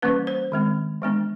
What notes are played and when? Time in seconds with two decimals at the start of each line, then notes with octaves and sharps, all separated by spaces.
0.02 E3 G3 A#3 C#4 B4
0.27 C5
0.52 D#3 G#3 C4
1.02 E3 G#3 B3 D4